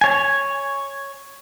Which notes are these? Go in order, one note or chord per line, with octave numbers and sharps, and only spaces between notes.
C#5 G#5